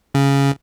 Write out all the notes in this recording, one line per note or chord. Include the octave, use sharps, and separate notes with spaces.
C#3